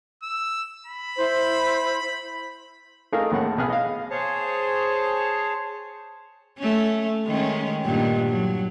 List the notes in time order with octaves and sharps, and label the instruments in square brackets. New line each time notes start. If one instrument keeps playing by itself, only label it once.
[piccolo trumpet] E6
B5
[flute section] E4 C5
[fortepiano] A3 D#4 G#4 A#4 F5
D#2 A2 F#5
B1 B3 G#4 F6 F#6
D#5 F5
[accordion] G#4 C5 C#5 A5
[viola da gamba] A3 C#4
D#3 G#3 C#4
G2 A#2 D#3
F#3